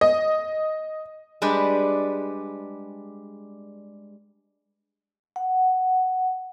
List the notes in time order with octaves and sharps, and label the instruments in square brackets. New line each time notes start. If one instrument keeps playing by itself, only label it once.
[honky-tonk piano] D#5
[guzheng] G3 G#3 D4 G4 B4
[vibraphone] F#5